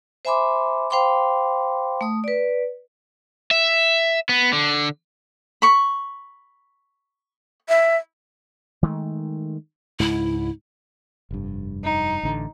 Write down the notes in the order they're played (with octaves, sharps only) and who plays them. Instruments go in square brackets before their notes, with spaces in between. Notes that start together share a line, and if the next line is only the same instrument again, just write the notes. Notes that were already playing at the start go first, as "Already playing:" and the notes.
[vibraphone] C5 E5 G#5 B5 C6 D6
C5 F5 G5 B5 C6 D6
A3 D#6
B4 D5
[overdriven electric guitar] E5
B3
D3
[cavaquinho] B5 C#6
[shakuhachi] E5
[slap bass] D#3 G#3 A3
[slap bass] C#2 G#2 [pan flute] E4
[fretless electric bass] F1 G2
[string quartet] D#4
[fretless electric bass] A1 D3